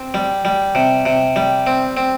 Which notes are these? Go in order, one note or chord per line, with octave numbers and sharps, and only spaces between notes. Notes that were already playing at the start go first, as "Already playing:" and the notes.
Already playing: C4
G3
G3
C3
C3
G3
C4
C4